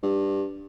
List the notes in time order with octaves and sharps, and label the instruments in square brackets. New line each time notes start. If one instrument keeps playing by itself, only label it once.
[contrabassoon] G2